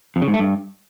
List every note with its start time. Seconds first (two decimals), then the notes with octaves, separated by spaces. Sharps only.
0.16 F2
0.22 C#3
0.28 G#2
0.34 A3
0.40 G2